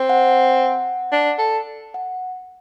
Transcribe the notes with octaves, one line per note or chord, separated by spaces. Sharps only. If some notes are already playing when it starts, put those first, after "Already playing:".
Already playing: C4
F#5
D4
A4
F#5